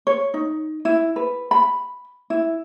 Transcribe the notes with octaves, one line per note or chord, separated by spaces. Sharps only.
C#5
D#4
E4
B4
B5
E4